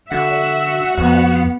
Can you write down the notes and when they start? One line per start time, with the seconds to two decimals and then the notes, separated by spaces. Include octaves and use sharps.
0.12 D3 F#4 E5 F#5
0.98 F2 B3